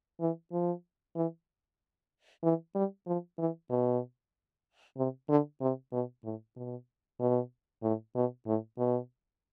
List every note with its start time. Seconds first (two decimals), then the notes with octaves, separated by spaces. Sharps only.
0.20 E3
0.52 F3
1.16 E3
2.43 E3
2.75 G3
3.06 F3
3.38 E3
3.70 B2
4.97 C3
5.29 D3
5.61 C3
5.92 B2
6.24 A2
6.56 B2
7.20 B2
7.83 A2
8.15 B2
8.47 A2
8.78 B2